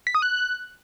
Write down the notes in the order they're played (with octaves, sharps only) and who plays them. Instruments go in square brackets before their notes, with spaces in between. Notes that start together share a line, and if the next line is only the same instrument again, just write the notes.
[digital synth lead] B6
D#6
F#6